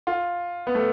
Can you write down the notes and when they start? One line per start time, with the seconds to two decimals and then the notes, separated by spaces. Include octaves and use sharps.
0.07 F4
0.67 B3
0.75 A3